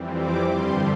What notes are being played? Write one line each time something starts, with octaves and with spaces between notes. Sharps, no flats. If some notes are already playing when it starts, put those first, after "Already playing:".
Already playing: F2 E3 G3 C4
D6
G2 D3 G3 C6